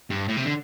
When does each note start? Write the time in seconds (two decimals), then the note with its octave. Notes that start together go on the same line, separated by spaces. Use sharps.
0.10 G2
0.28 A2
0.36 C3
0.44 D3